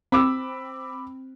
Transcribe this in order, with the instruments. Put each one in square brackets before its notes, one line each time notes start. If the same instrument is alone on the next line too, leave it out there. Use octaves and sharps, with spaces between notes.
[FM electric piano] C4 [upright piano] B5 D6 E6